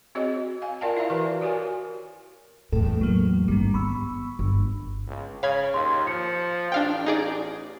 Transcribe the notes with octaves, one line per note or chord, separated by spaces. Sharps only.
C4 F#4 G#4 C#5 D#5
F5 G#5
F4 A#4 D5 F5 G5 A5
E4 E5 F5 A#5
E3 F#4 A#4 B4 D5
F#4 G4 A#4 C#5 G#5
E2 A2 A4
F#3 A#3
G#1 G2 D#3 G3
B3 B5 C#6 E6
G1
C#2
C#3 C#5 F5 B5 G#6
D#2 C6
F3 C#7
A1 D4 F5 G5
D#4 G#4 D5